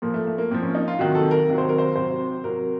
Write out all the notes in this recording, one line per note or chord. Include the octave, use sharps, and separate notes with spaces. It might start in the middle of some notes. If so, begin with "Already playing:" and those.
A#2 F3 A#3
A3
A3
A#3
A#2 F3 C4
C#4
D#4
F4
C3 D#3 F#3 F#4
A4
A#4
C3 D#3 F#3
C5
A#4
C5
C3 F#3 C5
C3 F#3 A#4